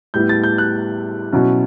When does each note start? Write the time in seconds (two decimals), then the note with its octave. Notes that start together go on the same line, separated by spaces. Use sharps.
0.14 A2 G3 B3 E4 G6
0.29 A6
0.43 G6
0.58 F#6
1.32 B2 F#3 C#4 E4